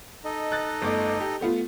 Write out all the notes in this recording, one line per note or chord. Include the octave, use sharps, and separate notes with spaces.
D#4 A4 D#5
F#6 A6
G1 A3 D6
G4
A3 B3 F4